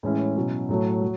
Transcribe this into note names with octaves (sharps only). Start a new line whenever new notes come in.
A2 E3 G#3 C#4 E4
B2 F#3 C#4 E4
A2 F#3 A3
F#3